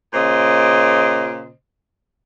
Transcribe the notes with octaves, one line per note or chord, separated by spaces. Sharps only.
A#2 C#3 C5 D#5